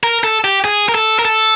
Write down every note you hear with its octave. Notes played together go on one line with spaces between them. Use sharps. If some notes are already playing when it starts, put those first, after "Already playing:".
A#4
A4
G4
G#4
A#4
A4
A#4
A4